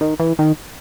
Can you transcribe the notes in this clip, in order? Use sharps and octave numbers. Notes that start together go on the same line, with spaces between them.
D#3
E3
D#3